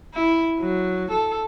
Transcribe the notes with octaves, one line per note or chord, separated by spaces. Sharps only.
E4
F#3
A4